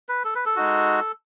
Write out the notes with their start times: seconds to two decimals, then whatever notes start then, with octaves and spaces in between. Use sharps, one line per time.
0.09 B4
0.25 A4
0.35 B4
0.46 A4
0.56 G#3 D#4 F#4